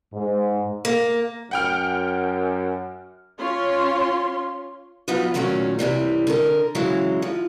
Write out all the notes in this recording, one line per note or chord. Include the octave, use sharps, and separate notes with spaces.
G#2
A#3
F#2 F#5 G5 F6
C#4 F4 C#5 C6
F3 F#3 B3 D#4 F4
A#2 D#3 F#3 A3 C#4
F#2 C3 E3 G3
D3 A4 A#4
C#3 E3 F#3 G#3 E4
F3